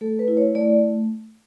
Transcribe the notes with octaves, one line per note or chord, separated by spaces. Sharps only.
A3 A4
B4
E4
C#5
A3 D5